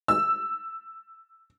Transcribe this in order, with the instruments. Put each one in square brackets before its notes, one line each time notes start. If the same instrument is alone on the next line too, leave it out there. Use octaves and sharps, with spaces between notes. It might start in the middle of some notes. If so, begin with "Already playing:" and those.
[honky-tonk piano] E6